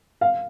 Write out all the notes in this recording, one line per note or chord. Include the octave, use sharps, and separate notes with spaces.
F5